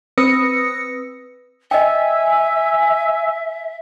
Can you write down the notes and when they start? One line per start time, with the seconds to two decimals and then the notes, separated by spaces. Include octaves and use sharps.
0.18 C4 B4 D#6 E6 A#6 C#7
1.71 D#5 E5 G5 G#5 E6